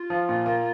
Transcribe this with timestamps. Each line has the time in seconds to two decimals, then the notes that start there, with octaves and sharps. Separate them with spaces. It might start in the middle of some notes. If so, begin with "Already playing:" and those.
Already playing: F4
0.10 F3
0.29 A#2
0.46 A#3